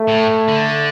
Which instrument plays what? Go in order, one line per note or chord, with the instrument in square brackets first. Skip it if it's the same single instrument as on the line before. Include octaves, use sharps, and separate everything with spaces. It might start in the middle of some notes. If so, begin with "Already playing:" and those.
Already playing: [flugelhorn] A3
[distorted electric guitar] A2
D3